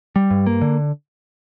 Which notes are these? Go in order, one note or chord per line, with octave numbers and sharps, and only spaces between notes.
G3
G2
A#3
D3